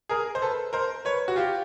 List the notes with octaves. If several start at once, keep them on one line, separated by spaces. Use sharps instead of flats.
G#4 A#4
C5
A4 B4
A#4 C5
B4 C#5
F#4
F4 G4